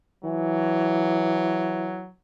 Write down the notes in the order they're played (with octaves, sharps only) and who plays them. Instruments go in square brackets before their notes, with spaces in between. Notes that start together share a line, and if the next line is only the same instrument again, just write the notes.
[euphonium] E3 [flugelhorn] F#3